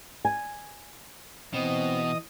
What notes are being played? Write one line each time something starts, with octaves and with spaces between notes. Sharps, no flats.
G#5
B2 E3 C4 D#5 D#6